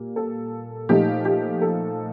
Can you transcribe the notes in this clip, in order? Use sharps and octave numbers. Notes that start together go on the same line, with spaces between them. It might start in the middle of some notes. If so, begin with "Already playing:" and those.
Already playing: A#2 G3 A#3
A4
A#2 F3 A3 D#4 G4
G4
A4